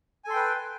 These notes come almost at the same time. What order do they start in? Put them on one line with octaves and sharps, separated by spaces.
G#5 A4 C6 G5 B4